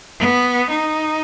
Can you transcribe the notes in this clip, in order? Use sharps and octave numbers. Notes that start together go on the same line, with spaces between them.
B3
D#4